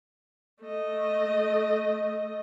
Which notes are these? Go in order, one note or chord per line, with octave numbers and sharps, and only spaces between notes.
A3 D#5